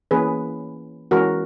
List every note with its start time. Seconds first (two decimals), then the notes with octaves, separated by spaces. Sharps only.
0.11 E3 A#3 C#4 G#4 B4
1.11 E3 G#3 C#4 F#4 A#4